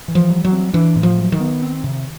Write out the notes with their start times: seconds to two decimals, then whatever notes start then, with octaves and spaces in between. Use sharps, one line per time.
0.08 E3
0.15 F3
0.30 G3
0.45 F#3
0.52 C4
0.73 E3 D4
0.95 A2
1.03 F3
1.18 F#3
1.32 D#3
1.40 B3
1.62 C4
1.83 C3